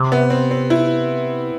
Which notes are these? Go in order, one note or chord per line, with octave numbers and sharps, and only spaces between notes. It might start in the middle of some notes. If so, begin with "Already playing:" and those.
Already playing: C3
B3
C4
C4
E4